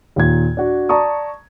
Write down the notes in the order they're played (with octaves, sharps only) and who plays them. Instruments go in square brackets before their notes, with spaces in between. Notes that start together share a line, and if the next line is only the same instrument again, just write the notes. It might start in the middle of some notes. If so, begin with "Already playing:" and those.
[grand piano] D#2 A#2 G#6
D4 F#4
D5 A5 A#5 C#6 D#6